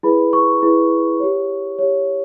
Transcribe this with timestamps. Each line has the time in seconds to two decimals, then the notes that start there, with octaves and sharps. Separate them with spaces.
0.03 E4 G#4 B4 B5
0.33 C#6
0.62 E4 G#4 B4
1.20 G4 C#5
1.79 G4 C#5